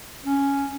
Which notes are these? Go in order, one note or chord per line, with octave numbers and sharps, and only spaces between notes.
C#4